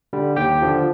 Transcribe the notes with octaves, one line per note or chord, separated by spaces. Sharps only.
D3 G3
D#2 G4 G5
D3 F3